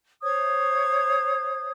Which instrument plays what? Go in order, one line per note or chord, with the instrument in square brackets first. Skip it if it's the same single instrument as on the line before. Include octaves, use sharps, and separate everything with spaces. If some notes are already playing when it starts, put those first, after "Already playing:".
[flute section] C5 C#5 D#6 G#6